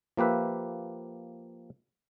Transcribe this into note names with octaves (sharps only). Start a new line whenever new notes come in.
F3 A#3 G4 B4 E5